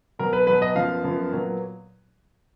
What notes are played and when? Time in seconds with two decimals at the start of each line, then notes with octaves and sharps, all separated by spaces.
0.19 B2 F#3 B3 A#4
0.33 B4
0.47 B2 F#3 B3 B4
0.62 D#5
0.75 F#2 F3 B3 F5
1.04 F#2 F3 B3
1.32 A#2 F#3 B3